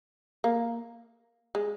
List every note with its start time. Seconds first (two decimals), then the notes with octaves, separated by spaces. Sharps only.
0.44 A#3
1.55 G#3